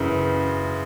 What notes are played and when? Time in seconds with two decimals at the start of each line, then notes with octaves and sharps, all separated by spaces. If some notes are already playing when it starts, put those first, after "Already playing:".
Already playing: F#2 C#3 E3